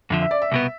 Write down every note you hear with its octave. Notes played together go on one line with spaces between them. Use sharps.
F2 D3 F3 E5
E5
D5
E5
C2 B2 B3